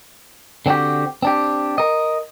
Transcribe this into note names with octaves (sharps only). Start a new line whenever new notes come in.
D3 C4 C#4 F#4 G4
C4 D4 G4
A#4 D#5